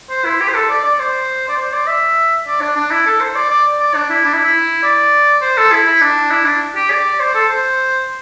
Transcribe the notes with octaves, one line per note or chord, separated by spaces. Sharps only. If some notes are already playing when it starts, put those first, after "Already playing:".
C5
E4
G4
C5
A4
D5
D5
C5
D5
C5
D5
E5
D5
D4
D4
E4
A4
C5
D5
D5
D5
D4
E4
D4
E4
E4
D5
C5
A4
E4
E4
D4
E4
D4
G4
D5
C5
A4
C5